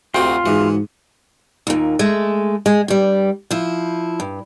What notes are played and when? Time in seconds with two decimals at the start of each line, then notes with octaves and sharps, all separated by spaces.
0.15 D2 C3 F4 F#4 G5
0.46 G#2 E3 F#4 G#4
1.67 D#2 A#2
1.99 G#3 A3
2.66 G#3
2.88 G2 G3
3.51 F3 E4
4.20 G2